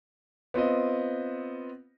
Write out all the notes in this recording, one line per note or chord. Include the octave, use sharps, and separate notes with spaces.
B3 C4 F4 D#5